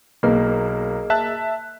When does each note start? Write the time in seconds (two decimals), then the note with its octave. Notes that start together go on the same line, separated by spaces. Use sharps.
0.23 B1 A#3 G#4 D#5
1.10 E5 A5 F#6